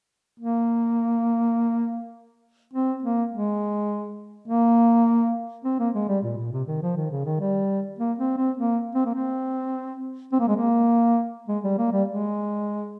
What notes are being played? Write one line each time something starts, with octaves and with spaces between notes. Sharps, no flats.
A#3
C4
A#3
G#3
A#3
C4
A#3
G#3
G3
A#2
A#2
C3
D#3
F3
D#3
C#3
D#3
G3
A#3
C4
C4
A#3
C4
A#3
C4
C4
A#3
G#3
A#3
G#3
G3
A#3
G3
G#3